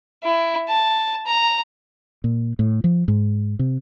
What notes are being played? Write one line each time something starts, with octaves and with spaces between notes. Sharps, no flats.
E4
A5
A#5
A#2
A2
F3
G#2
C3